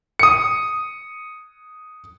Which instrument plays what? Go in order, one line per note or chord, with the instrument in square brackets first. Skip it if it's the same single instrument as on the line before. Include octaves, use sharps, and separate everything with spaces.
[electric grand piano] D#6 C#7